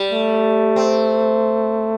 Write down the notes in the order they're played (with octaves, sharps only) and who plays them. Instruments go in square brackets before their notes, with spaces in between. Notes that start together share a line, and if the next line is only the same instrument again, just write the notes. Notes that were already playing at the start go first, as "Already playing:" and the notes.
Already playing: [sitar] G3
[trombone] A3
[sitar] C4